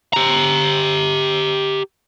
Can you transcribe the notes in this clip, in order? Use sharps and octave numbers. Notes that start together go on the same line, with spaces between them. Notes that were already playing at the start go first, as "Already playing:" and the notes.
G4 A#5